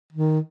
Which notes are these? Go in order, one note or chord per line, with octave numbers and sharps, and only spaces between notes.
D#3